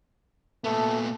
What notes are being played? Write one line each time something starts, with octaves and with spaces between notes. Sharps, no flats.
A#2 A3 B3